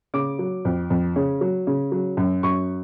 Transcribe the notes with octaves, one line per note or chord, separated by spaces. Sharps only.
C#3 D6
F#3
F2
F2
C#3
F#3
C#3
F#3
F#2
F#2 C#6